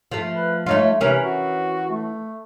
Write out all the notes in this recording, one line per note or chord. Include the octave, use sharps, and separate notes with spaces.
F3 A3
B4
A3 D#4 F4 C#5
C3 E3 C#4 A#4
F#4
A3